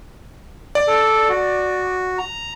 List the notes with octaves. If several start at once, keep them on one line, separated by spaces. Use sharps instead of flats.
D5
A4
F#4
A#5